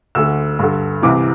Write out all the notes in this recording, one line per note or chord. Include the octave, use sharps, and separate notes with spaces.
D2 D3 E6
G2 D3
C2 C3 E3 D6